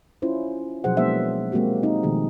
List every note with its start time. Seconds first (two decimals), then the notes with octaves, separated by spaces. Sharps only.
0.22 C#4 E4 F4 C5
0.84 B2 F3 F#3 G#4 C5 F#5
0.97 G#3 A#3 B3 D4 C5 E5
1.52 G#3 A#3 C4 F#4 G4
1.83 C4 D#4
2.03 B2 D#3 F3 A3 A#3 G#4